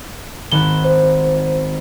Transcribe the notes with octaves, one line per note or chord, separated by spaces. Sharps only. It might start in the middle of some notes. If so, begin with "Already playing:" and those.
G#1 F#6 E7 G7
C5